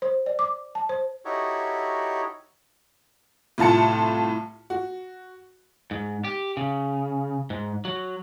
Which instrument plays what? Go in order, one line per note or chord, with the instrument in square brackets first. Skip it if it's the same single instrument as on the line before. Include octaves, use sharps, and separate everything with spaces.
[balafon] C5
D5
D6
A5
C5
[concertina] D#4 E4 F#4 G4 A4 C#5
[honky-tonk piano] C2 A2 F4 A5 C#7
F#4
[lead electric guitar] G#2
G4
C#3
G#2
F#3